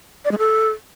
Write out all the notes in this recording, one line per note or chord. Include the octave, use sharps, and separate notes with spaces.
D5
G#3
A4